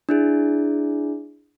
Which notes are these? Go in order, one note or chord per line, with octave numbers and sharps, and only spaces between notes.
D4 E4 G#4